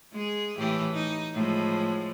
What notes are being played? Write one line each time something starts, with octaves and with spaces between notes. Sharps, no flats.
G#3 G#4
A2 E3 G4
D#4
A2 F3 G#3